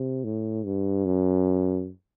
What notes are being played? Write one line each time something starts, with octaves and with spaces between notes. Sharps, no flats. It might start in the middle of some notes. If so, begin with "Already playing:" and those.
Already playing: C3
A2
G2
F#2